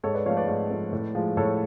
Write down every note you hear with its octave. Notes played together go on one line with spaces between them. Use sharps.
G#2 A4 C#5
B4 D5
F3 A3 C#5 F5
B4 D5
G#2
F3 A3
A2
F3 G#3
A2 A4 C#5